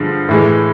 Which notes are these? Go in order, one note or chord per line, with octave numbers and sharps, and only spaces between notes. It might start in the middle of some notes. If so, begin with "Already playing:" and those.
Already playing: G2 D3 F3 G#3
A2 E3 G#3